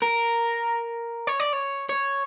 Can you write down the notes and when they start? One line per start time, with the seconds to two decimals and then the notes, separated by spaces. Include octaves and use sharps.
0.02 A#4
1.27 C#5
1.40 D5
1.53 C#5
1.89 C#5